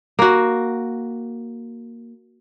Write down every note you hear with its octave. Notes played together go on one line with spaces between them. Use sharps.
A#3 F#4